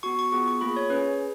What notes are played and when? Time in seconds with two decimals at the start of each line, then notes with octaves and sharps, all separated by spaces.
0.03 B3 F#4 C#6
0.19 C#6
0.32 B3 F4 G#4 C#6
0.48 C#6
0.61 A#3 F4 G#4 B5
0.77 C#5
0.90 C#4 G#4 B4